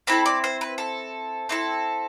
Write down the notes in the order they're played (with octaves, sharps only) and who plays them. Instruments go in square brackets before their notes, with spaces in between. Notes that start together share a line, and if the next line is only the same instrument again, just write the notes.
[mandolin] C4 E4 A4 B5
D5
C5
B4
A4
C4 E4 A4